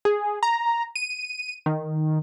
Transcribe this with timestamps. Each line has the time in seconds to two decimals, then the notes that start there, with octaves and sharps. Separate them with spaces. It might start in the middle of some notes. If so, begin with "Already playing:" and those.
0.05 G#4
0.43 A#5
0.96 D#7
1.66 D#3